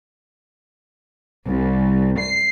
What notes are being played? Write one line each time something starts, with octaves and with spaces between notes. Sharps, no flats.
C2
C7